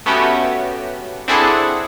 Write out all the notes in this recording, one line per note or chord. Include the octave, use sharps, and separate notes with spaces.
A3 B3 C#4 F#4 G4
C4 D4 E4 G#4 A4 F#5